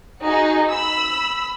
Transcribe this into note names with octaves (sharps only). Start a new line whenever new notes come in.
D#4 F#4 G#4
B5 E6